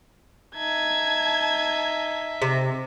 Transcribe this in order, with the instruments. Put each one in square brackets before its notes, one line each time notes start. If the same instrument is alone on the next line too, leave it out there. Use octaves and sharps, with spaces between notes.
[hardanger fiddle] D#4 E5 [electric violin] A5 G#6
[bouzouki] C3